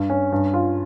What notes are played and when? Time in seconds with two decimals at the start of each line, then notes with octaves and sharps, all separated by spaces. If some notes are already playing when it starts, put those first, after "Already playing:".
Already playing: G2
0.10 C#4
0.32 G2
0.54 F4